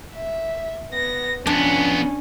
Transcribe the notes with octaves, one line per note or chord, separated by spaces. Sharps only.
E5
B3 A#6
F2 B3 C#4 D4